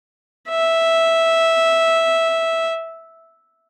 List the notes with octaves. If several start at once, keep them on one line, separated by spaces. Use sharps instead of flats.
E5